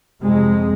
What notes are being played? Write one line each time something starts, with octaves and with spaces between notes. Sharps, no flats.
F2 C3 G#3